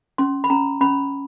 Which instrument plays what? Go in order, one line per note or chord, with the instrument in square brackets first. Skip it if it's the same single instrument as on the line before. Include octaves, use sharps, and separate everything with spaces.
[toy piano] C#4 C6
B5
C#4 A#5
C#4 B5